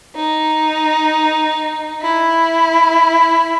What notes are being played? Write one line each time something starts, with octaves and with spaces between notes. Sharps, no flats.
D#4
E4